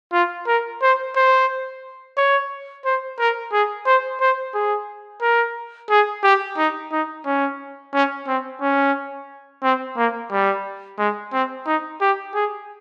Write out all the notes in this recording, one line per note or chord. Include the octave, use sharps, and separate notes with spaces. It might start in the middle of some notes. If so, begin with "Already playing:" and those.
F4
A#4
C5
C5
C#5
C5
A#4
G#4
C5
C5
G#4
A#4
G#4
G4
D#4
D#4
C#4
C#4
C4
C#4
C4
A#3
G3
G#3
C4
D#4
G4
G#4